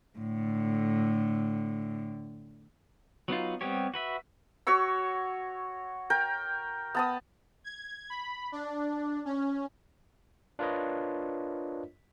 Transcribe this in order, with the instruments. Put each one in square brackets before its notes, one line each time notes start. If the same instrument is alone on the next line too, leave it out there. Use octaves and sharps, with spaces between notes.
[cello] A2 D3
[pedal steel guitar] F#3 B3 D#4 F4
G3 B3 C4 G4 C#5
F#4 B4 E5
[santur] F#4 C#5 C#6 E6
A#4 G5
B3 A5 D#6
[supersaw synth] G#6
B5
D4
C#4
[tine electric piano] D4 F4 A#4 B4 C#5 D#5